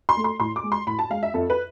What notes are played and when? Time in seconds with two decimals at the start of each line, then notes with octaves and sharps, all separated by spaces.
0.09 C6
0.17 A3
0.24 C6
0.40 A2 C6
0.56 D6
0.63 G#3
0.72 C6
0.87 A2 B5
0.99 A5
1.10 G#3 F5
1.23 E5
1.34 F2 A4
1.50 B4